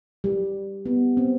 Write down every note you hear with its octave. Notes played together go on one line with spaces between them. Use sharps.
G3
B3
C4